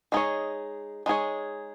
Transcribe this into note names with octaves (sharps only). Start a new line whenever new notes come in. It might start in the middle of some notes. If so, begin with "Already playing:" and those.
G#3 D#4 G#4 C#5
G#3 D#4 G#4 C#5